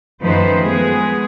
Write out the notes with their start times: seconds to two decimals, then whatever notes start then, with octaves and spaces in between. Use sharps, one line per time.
0.21 F#2 D#3 F3 A3 B4 C5
0.62 G#3 B3 G#4